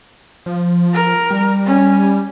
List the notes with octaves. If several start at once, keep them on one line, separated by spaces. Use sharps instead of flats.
F3
A#4
G3
C#4